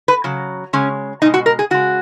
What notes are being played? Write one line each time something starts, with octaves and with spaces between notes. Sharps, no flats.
B4
C#3 F#3
C#3 G#3 C#4
B2 G#3 D#4
F#4
A#4
G#4
C#3 G#3 F#4